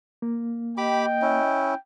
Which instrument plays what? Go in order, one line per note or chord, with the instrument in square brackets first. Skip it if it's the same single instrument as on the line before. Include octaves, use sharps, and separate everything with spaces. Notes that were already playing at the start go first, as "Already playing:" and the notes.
[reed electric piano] A#3
[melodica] G4 B5 D6 [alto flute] D#5 [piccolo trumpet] G5
[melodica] C#4 E4